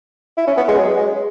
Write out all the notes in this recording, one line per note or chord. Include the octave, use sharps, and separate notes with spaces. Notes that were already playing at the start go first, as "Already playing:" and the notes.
E4
C#4
B3
G#3
F#3
G#3